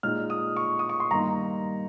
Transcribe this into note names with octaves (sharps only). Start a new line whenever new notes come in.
A#2 G#3 D#4 F6
D#6
C#6
D#6
C#6
C6
G2 D#3 A#3 D#4 A#5